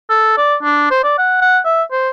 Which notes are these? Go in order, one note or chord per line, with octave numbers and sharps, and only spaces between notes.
A4
D5
D4
C5
D5
F#5
F#5
E5
C5